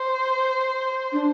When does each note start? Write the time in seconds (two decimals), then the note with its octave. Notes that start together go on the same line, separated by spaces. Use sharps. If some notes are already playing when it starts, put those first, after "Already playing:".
Already playing: C5
1.13 D4